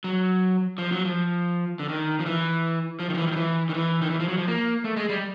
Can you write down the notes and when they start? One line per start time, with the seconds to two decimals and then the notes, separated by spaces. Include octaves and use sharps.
0.04 F#3
0.78 F3
0.92 F#3
1.05 F3
1.79 D3
1.89 D#3
2.20 F3
2.26 E3
3.00 F3
3.10 D#3
3.14 F3
3.18 E3
3.27 D#3
3.32 F3
3.36 E3
3.69 D#3
3.74 E3
4.02 D#3
4.10 E3
4.20 F3
4.28 F#3
4.38 F3
4.47 A#3
4.84 A3
4.96 G#3
5.09 G3